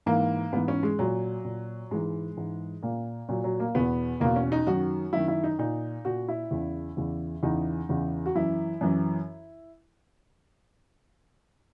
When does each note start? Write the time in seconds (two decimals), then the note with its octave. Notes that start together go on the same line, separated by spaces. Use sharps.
0.06 G#2 E3 A#3
0.53 G#2 E3 B3
0.68 C#4
0.83 G#3
0.99 A#2 F#3
1.44 A#2
1.91 G#2 E3 G#3
2.37 G#2 E3
2.83 A#2 A#3
3.29 A#2 F#3
3.44 F#3
3.60 A#3
3.75 E2 B2 B3
4.20 E2 B2 A#3
4.36 C#4
4.52 D#4
4.67 F#2 D#3 F#4
5.13 F#2 D#3 E4
5.28 E4
5.44 D#4
5.59 A#2 D#4
6.05 A#2 F#4
6.28 E4
6.51 E2 C#3 E3
6.97 E2 C#3 E3
7.43 E2 C#3 E3 D#4
7.89 E2 C#3 E3
8.26 F#4
8.35 F#2 E3 E4
8.81 F#2 E3